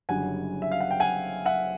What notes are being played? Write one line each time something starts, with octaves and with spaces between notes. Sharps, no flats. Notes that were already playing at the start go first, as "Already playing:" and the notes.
F#1 F#2 D3 G3 F#5 G#5
E5
F5
F#5
G5
F#5 G#5
E5 F#5